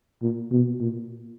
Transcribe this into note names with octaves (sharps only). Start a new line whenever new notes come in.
A#2
B2
A#2